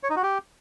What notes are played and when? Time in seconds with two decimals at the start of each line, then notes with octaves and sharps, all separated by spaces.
0.03 C#5
0.10 D#4
0.16 F#4
0.23 G4